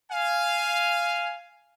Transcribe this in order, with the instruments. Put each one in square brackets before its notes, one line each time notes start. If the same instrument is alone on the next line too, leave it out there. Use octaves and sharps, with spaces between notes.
[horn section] F5 G#5